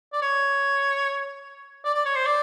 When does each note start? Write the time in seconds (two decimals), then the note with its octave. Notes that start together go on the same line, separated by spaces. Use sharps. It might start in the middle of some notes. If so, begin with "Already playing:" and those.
0.13 D5
0.22 C#5
1.85 D5
1.95 D5
2.05 C#5
2.15 C5
2.26 D5